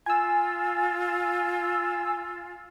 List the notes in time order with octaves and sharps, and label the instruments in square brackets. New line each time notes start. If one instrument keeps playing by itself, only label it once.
[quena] F4 [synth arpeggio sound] G#5 E6